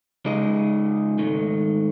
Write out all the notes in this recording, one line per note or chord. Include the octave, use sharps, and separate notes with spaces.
C#3 G#3 D#4 G#4 D#5
G#2 D#3 A3